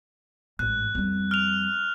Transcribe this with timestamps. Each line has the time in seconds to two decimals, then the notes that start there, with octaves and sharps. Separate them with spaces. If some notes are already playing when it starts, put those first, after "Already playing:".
0.59 A1 G#2 F#6
0.95 F2 G3
1.31 F6 F7